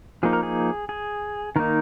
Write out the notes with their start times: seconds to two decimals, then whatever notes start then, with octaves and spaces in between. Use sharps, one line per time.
0.23 F3 A#3 D#4 G#4
0.33 A#4
0.43 G#4
0.89 G#4
1.56 D#3 A#3 D#4 A#4